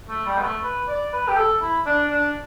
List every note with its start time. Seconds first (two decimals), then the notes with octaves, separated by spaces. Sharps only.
0.09 A3
0.26 G3
0.38 B3
0.44 A3
0.63 B4
0.88 D5
1.13 B4
1.28 G4
1.36 A4
1.61 E4
1.86 D4
2.11 D4